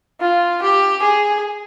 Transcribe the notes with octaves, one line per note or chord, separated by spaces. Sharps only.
F4
G4
G#4